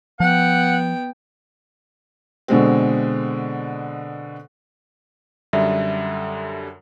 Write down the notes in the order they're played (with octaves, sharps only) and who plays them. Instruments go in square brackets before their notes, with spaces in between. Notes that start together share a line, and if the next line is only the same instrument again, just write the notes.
[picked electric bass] F3 [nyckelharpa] B3 G5 [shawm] F#5
[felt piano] B2 D3 G#3 C4
[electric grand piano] F#2 D3 G3 [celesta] E5